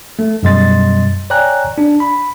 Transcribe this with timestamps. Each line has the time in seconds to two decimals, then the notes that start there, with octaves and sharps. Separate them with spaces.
0.19 A3
0.43 F#2 B2 G3 D#5 C6 A6
1.30 C#5 D5 G5 G#5 A#5 F#6
1.78 D4
2.00 B5